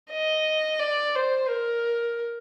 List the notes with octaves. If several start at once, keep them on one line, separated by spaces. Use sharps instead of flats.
D#5
D5
C5
A#4